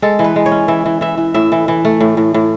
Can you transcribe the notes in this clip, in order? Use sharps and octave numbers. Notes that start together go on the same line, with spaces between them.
G#3 A4
E3
B4
G#3
C#5
C#4
E3 E5
E3
E3 E5
E3
A2 E5
E3
E3
A3
A2
A2
A2